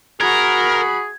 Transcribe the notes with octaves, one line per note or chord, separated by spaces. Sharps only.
F#4 G#4 A#4 B5 G#6